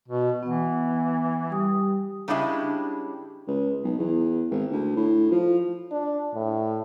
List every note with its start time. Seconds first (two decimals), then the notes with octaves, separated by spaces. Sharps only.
0.08 B2
0.43 E3 B3 F#5
1.50 G3 G4 D#6
2.28 C#3 G3 G#3 D4 E4 G4
3.47 C#2
3.84 B1
3.99 E2
4.51 G#1
4.71 D2
4.96 A2
5.31 F3
5.92 D4
6.34 A2